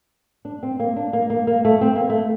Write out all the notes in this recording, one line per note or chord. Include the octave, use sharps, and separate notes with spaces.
D4
C4
A#3
D4
A#3
A#3
A#3
A3
C4
A#3
A3